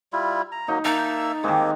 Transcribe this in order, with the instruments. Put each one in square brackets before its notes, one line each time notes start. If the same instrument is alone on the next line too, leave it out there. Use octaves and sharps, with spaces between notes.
[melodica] G3 E4 F4
A#5
[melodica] F#3 A#3 [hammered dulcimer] D#4
[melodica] A#3 E5 E6 [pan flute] D#4 [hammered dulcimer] A5
[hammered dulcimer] D#3 G#3 [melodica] A#3 C4 G4